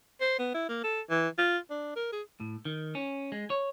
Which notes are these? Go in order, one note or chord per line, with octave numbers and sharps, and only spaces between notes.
C5
B3
E4
A#3
A4
E3
F4
D4
A#4
G#4
A2
D#3
C#4
G#3
C#5